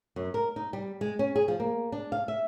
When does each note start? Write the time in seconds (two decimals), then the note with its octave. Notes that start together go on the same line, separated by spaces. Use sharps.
0.16 F#2
0.34 A#4
0.56 D#4
0.73 G3
1.01 G#3
1.19 C#4
1.36 G#4
1.48 F3
1.60 A#3
1.92 D4
2.12 F5
2.28 E5